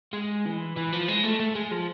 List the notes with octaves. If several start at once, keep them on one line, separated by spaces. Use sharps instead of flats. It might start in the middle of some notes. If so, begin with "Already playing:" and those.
G#3
E3
E3
F3
G#3
A3
A3
G#3
F3